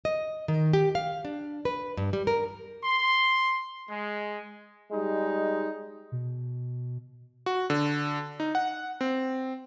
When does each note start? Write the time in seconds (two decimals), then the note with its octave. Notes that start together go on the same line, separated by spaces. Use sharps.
0.05 D#5
0.48 D#3
0.73 G4
0.95 F5
1.25 D4
1.65 B4
1.97 G2
2.13 G3
2.27 A#4
2.84 C6
3.90 G#3
4.92 G3 G#3 D#4
6.12 B2
7.46 F#4
7.70 D3
8.40 D#4
8.55 F#5
9.01 C4